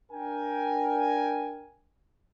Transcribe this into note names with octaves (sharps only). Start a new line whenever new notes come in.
D4 A#4 G5 G#5